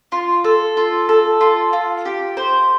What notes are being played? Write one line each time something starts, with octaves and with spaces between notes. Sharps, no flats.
F4
A4
F4
A4
F4
F4
G4
C5